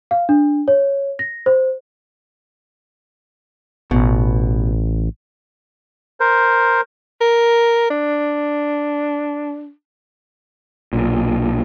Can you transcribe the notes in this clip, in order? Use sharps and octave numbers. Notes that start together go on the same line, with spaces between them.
F5
D4
C#5
A#6
C5
A1 B2
A#4 C5
A#4
D4
B1 A#2